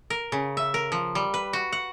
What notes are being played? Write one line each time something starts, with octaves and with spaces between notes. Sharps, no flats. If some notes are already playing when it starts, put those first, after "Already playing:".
A#4
C#3
E5
A#4
F3
G3
B4
F#4
F#5